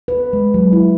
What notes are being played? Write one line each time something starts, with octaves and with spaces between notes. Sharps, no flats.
B4
G#3
F#3
E4